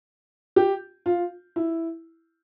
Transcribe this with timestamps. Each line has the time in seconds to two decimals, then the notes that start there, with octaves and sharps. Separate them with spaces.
0.56 G4
1.06 F4
1.56 E4